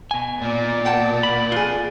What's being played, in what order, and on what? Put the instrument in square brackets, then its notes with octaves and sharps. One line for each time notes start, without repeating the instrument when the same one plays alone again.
[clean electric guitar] B2 G#5
[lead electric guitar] A#2 [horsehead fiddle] D5
[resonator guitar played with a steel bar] F#5 G5 A5
[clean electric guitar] B5
[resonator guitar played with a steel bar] F2 G#4 [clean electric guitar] F4